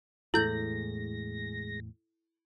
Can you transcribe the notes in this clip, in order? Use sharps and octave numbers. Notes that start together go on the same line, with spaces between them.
E2 A2 G#3 E4 A4 G6 A#6 F#7